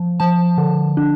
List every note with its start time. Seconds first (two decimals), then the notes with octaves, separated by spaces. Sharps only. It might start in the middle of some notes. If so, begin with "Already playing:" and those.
Already playing: F3
0.20 F3 A5
0.58 D3
0.97 D4